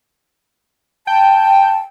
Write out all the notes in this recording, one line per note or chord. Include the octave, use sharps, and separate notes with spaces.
G5 A5